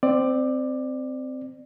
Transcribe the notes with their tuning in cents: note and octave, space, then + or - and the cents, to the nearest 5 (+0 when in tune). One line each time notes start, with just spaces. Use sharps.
C4 -10 D5 +15